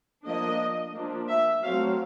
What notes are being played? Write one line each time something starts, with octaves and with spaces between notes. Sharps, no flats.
F3 A#3 D4 D#5
F3 A#3 D4
E5
F#3 A3 C4 F5